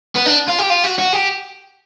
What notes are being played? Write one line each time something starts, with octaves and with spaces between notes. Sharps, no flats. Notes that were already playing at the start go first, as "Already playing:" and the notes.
B3
D4
F4
G4
F4
F#4
F#4
G4